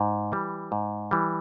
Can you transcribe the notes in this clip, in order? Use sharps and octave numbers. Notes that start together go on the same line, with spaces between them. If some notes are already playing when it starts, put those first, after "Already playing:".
Already playing: G#2
E3 G3
G#2
E3 G3